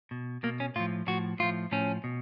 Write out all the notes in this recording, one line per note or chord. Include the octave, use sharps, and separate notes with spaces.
B2
B2 A#3
C#4
A2 F3 F4
A2 F3 F#4
A2 F3 F4
A2 F3 C#4
B2